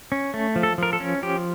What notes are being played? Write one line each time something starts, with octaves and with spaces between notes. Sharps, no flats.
C#4
A3
F3
A4
F3 A#4
A4
C#4
F3 G4